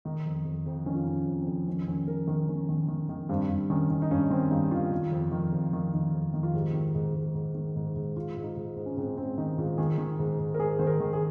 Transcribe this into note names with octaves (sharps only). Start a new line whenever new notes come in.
D#3 D#4
F2
F2
F2
D#3 C#4
F4
D#3 D#4
C#4
F2
C4
F2
D#3 C#4
D#3 C#4
D#3 A#4
D#3 A#4
D#3 C#4
D#3
D#3
D#3
G2 C4
G2
D#3 C#4
D#3
D#4
G2 C#4
D#3 C4
G2 D#4
D#3 F4
D#3
F2
D#3
F2
D#3
D#3
F2
D#3
F4
G#2 G4
D#3
G#2
G#2
G#2
D#3
G#2
G#2
G#2 F4
G#2
D#4
G#2
G#2
C#4
G#2 C4
C#4
G#2 C4
D#3 D#4
G#2 F4
D#3 G#4
D#3
G#2
G#2
A#4
G#2 G#4
D#3 C5
A#4
D#3
G#4